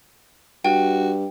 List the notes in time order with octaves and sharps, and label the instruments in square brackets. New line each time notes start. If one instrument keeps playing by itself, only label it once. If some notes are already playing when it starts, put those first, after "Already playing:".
[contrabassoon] G2 [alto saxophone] F#4 [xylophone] G5